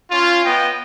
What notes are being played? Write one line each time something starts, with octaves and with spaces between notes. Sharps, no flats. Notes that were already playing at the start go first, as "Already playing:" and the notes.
C#4 F4
B3 D#5 G5